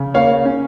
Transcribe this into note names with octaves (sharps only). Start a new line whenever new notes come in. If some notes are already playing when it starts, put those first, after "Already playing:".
Already playing: C#3
A#3 C#5 F5
C#4